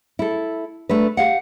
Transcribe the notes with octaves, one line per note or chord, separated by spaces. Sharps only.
E4 A4
A3 D4 B4
G4 F5 F#5